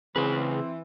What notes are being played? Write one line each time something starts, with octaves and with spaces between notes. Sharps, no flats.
C#3 E3 C4 G#4 B4 C6